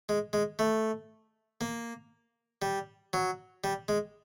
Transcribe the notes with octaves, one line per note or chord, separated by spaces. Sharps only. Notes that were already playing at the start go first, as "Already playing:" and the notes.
G#3
G#3
A3
A#3
G3
F#3
G3
G#3